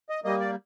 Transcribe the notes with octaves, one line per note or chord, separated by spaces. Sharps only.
D#5
G3 A#3 D#5
D5